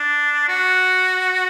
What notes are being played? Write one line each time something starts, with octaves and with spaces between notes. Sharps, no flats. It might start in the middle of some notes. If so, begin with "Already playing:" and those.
Already playing: D4
F#4